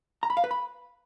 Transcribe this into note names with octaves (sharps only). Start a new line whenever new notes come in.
A#5
B5
F5
B4
B5